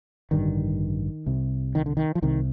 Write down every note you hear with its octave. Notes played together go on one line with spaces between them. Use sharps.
A1 G2 D3 D#3
C2 C3
D#3
D3
D#3
F3
C2 C3 D#3